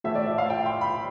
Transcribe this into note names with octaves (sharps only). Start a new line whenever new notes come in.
A2 E3 A3 E4 E5
D5
E5
F5
G5
C6
B5